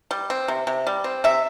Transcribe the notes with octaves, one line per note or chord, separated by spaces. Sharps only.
G3
C4
C3
C3
G3
C4
C3 E5